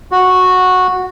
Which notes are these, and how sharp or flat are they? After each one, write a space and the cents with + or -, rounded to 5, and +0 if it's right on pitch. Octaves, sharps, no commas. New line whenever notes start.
F#4 -10